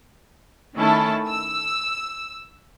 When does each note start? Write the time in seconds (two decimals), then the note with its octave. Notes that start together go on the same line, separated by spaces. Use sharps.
0.76 D#3 A3 C#4 E4 A4 A5
1.27 E6